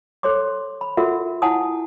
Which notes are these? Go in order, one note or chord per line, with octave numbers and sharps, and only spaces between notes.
A4 C5 C#5 C6 D6
B5
F4 F#4 A4 A#4 E5 F#5
E4 F#5 G#5 A5 D#6